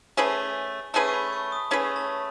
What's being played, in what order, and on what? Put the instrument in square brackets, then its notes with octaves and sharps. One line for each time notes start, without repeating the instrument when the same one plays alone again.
[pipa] A3 C#4 G#4 B4 [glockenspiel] G#5
[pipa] A3 C#4 G#4 B4 [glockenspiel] A5
[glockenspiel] C#6
B5
C#6
D#6
[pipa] A3 C#4 G#4 B4 [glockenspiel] D#6
[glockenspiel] A5